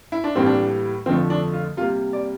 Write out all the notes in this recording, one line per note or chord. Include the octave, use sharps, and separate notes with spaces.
E4
D4
A2 E3 G3 A#3 C4
D4
F2 D3 F3 A3 C4
D4
F4
C3 G3 A#3 F4
D5